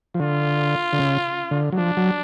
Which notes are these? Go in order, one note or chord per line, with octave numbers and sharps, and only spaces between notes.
F3
D3 F4
D3
C#3
D3
F#3
F3 D4
F#3